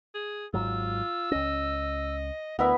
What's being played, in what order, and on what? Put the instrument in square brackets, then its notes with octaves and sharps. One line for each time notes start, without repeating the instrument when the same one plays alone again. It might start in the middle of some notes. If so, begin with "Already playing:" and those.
[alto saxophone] G#4
[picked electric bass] G#1 G#2 F#3 [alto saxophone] F4 [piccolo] E6
[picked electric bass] C#2 C#4 [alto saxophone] D#5
[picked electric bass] D2 [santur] B3 E4 E5 [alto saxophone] A#4